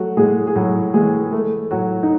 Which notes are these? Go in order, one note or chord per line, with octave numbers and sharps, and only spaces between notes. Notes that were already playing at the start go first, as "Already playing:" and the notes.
Already playing: F#3 A3 F#4
A2 G#3 G#4
G#4
A2 F#3 F#4
E3 G#3 G#4
A3
A2 F#3 F#4
D#4